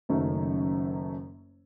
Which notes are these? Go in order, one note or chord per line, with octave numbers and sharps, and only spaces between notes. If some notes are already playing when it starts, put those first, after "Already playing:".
F#1 F#2 D#3 F#3 A3